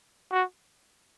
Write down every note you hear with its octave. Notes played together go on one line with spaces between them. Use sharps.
F#4